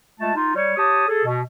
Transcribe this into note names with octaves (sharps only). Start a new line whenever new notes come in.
G#3 A3 F4 A5
D#4 F4
G3 C#5
G4 C#5 A5 D#6
G#4 A4
B2